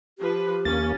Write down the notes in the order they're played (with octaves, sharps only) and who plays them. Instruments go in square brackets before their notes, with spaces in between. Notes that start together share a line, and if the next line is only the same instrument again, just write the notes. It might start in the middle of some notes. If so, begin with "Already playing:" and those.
[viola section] F3 B4 [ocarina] G4
[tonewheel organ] D#2 A#3 [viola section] C#4 [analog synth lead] A6